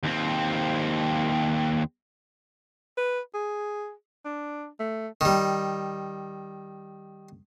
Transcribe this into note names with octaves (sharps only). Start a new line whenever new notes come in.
D#2 C4
B4
G#4
D4
A3
D#3 G3